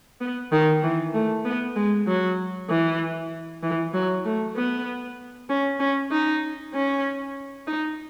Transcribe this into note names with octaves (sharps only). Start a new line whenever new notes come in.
B3
D#3
E3
A3
B3
G#3
F#3
E3
E3
F#3
A3
B3
C#4
C#4
D#4
C#4
D#4